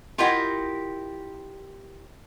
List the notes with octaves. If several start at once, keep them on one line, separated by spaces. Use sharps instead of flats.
E4 F4 G4 A#4 D#5 F#5